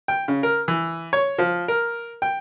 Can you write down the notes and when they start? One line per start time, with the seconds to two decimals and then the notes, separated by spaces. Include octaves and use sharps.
0.08 G5
0.28 C#3
0.43 A#4
0.68 E3
1.13 C#5
1.38 F3
1.68 A#4
2.22 G5